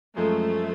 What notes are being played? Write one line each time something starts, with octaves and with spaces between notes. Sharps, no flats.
F#2 F3 G#3 A3